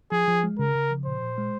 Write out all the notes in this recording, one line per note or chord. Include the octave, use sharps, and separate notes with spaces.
F3 G#4
F3
G#3
C#3 A#4
C#3
F3
A#2 C5
A#2
G#3